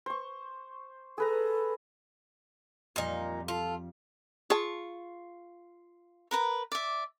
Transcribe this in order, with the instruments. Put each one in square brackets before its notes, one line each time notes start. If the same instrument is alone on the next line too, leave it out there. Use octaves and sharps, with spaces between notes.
[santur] C5 C#6
[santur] G#4 B4 A#5 [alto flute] A4
[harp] F2 F3 G3 [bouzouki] A#2 D#4
[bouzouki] F4 [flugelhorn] A4
[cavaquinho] F4 C#6 [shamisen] G#4 A5
[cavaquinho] A#4 B4 A#5
D5 E5